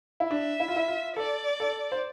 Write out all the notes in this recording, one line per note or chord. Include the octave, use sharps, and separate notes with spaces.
E4
D4 E5
E4
F4
E4
F4
A4 D5
A4
C5